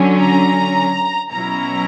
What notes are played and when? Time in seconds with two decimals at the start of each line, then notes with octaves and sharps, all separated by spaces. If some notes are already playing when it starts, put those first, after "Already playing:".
Already playing: D3 F#3 C#4
0.19 A#5
1.30 B2 F#3 C#4 E4 A#5